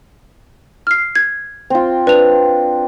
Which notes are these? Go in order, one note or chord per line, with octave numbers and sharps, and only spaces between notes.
F6 C7
G#6
C4 F4
D4 B4 F7